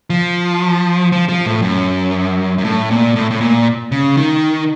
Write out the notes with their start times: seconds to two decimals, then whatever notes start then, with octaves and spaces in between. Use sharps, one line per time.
0.10 F3
1.12 F3
1.29 F3
1.46 A2
1.62 F#2
2.58 F#2
2.64 A2
2.91 A#2
3.16 A2
3.31 A2
3.41 A#2
3.92 C#3
4.17 D#3